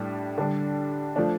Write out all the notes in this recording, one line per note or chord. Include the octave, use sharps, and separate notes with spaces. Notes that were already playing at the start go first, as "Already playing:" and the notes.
Already playing: A2 G3 D4
D3 G3 D4
F3 A3 D4